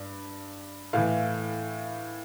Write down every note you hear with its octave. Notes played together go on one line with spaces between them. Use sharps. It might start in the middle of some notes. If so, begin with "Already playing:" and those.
Already playing: G2
A2 E3 F5